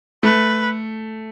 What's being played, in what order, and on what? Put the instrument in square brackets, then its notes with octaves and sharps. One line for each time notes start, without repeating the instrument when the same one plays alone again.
[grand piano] A3 [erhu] B4